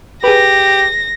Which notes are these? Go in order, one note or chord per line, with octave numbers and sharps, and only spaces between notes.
G4 G#4 B4 A#6